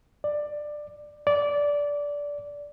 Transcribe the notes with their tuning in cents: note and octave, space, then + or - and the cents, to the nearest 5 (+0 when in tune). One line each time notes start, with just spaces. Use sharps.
D5 +15
D5 -15